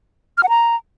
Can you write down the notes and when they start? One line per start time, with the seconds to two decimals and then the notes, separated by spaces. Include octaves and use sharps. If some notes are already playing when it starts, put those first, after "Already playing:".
0.38 F6
0.43 F#5
0.49 A#5